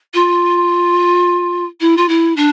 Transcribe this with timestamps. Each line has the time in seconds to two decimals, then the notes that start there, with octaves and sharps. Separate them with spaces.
0.14 F4
1.80 E4
1.97 F4
2.08 E4
2.36 D4